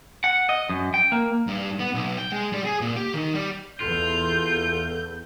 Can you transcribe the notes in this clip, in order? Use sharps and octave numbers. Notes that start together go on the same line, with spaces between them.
F#5
D#5
F#2
G5
A#3
G2
B3
B1
G5
G#3
G3
G#4
A#2
G4
D#3
G3
E2 F4 A4 G6